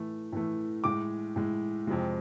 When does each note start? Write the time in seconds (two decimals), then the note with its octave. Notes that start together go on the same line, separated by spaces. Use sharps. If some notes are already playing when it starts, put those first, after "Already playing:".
Already playing: A2 E3 A3
0.32 A2 E3 A3
0.84 A2 G#3 D6
1.36 A2 G#3
1.87 F2 C3 G#3